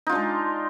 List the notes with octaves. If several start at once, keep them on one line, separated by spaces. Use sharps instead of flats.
G#3 D4 D#4 F4